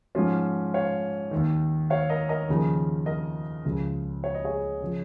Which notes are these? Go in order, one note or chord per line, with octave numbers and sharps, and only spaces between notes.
G#2 F3 C#4 F4
C#5 F5
D#2 D#3
C#5 F5
A#4 D#5
A#4 D#5
D#2 C#3 F3
A#4 D#5
C#2 C#3 F3
C#5
D#5
G#4 C#5
C#3 F3